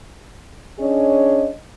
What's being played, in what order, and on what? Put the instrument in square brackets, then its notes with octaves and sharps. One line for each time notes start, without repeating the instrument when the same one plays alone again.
[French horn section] C#4 D4 G#4 C#5 D#5